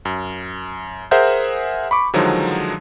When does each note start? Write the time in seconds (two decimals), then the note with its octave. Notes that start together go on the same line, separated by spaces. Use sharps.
0.05 F#2
1.11 G#4 A#4 C5 E5 F#5 G6
1.91 B5 C#6 D6
2.14 D3 D#3 F3 F#3 G#3 D#4